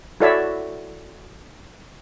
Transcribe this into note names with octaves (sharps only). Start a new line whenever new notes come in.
E4 F#4 A4 C#5 D5 E5